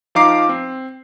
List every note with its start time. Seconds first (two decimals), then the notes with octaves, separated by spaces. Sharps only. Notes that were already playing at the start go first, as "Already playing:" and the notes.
0.15 F3 D#4 F5 A#5 D6 C7
0.49 C4